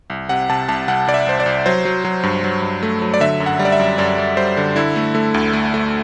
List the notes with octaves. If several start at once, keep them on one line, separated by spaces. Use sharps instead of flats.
C2
C3 F#5
C3 A5
C2 A5
C2 F#5
C2 D5
E5
C2 C5
D5
C2
F#3 C5
F#3
F#3
G2
F#3
G2
A3
F#3
D5
D3 E5
F#2
F#5
G3
D5
E5
F#2
F#2 D5
F#2
G3 C5
D3
D3 E4
A3
A3
D2
A3
A3